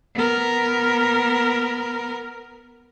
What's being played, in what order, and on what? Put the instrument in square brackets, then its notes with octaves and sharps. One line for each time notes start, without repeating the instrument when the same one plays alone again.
[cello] B3 A#4